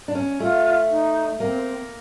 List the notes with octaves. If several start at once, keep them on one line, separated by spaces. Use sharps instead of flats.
D4
C#4
A3 F4
D#4
A#3 C4